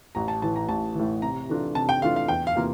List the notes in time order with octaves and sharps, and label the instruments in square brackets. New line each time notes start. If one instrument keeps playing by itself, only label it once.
[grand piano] A1 [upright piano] A#5
[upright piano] A5
[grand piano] A2 E3 [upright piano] A5
[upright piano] A#5
[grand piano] A1 [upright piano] A5
[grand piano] A2 E3
[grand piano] C3 [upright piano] A#5
[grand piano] E3 A3 D4 F4
[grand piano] C3 [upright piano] A5
[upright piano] G5
[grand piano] E3 A3 D4 F4 [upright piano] F5
[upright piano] F5
[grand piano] E2 [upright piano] G5
[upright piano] F5
[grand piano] C3 E3 A#3 F4